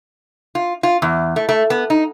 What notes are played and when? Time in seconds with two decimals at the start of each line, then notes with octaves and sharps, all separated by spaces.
0.55 F4
0.83 F4
1.02 E2
1.36 A3
1.49 A3
1.70 B3
1.90 D#4